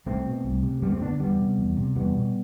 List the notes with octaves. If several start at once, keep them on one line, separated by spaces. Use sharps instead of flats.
C2 A3 C4
B2
C2
C3
F#2 G3 B3
A3 C4
D3 B3 D4
E2 G3 B3
C3
E2
C3
E2 G3 B3
B2